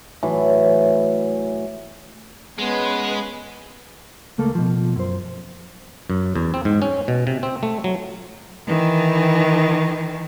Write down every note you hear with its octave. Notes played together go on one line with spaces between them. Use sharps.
A2 E3 F#3
G#3 B3 C#4 B4 C6
C#2 A3 A#3 A4
B2 F3
F#2 C5
F#2
E2
C4
G#2
C#4
B2
C3
C4
A3
F#3
D#3 E3